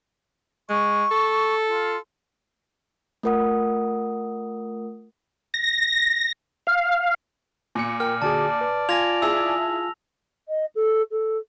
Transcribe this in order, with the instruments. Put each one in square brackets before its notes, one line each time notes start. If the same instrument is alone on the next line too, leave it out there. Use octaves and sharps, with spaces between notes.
[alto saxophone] G#3 [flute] C#6
[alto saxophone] A4
[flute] F4
[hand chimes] A3 F4 A#4 F#5 D#6
[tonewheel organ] A#6
F5
[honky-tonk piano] A#2 C#7
[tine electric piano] A#4 G5 [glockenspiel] F6
[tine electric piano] D3 F#4 G#4 [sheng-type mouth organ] D5 [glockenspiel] A5
[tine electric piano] B4
[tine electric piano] F4 G#5 [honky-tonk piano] G#6 [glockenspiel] A#6 F7
[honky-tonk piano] E4 G#4 A5 [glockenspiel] E6
[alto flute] D#5
A4
A4